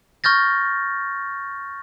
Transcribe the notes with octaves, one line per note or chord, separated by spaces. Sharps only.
C#6 F6 G6 A6 A#6